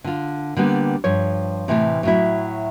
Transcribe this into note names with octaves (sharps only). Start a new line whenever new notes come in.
D3 F4
D3 G3 A#3 B3
G2 F3 C#5
A2 C3 E3 G3 A3
A2 F#3 E4